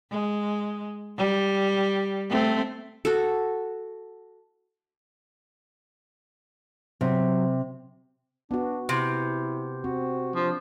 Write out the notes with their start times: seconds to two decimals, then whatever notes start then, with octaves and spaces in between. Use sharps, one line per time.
0.11 G#3
1.17 G3
2.29 A3 C4
3.05 F#4 A4
7.01 C3 F#3
8.51 B3 D4 F#4
8.89 C3 E4
9.84 C4 F#4
10.36 F3 D4